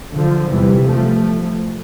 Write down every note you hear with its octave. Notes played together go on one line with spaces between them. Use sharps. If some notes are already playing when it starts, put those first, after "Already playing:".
D3 F3
E2 C3 E3 G3
F3 A3